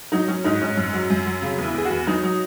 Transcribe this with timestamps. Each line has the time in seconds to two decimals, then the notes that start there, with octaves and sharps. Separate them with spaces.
0.12 F#3 D#4
0.28 F#3 C#4
0.44 G#2 D#4
0.61 G#2 C#4
0.77 F#2
0.93 F#3
1.10 F#2
1.26 F#3
1.42 C#3
1.58 E2
1.64 E4
1.74 E2 G#4
1.85 F#4
1.90 E2
2.07 F#3 D#4
2.23 F#3